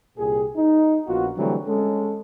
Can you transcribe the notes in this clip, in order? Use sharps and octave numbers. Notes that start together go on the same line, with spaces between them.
C2 A#2 G4 G#4
D#4
A#1 B3 F4 F#4
D3 E3 F#3 G3 A3 C4
G#3 C#4 A4